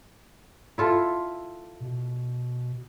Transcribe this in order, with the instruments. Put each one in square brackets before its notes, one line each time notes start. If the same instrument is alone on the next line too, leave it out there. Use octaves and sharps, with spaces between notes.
[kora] E4 F4 A4
[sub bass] B2